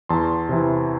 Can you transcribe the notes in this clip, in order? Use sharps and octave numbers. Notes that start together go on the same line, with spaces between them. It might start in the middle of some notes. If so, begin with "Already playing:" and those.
E2 A5 C6
C3 E3